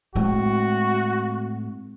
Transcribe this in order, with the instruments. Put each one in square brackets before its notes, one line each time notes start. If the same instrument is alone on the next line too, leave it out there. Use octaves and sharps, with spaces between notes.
[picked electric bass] A2 [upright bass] G#3 C4 [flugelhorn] F#4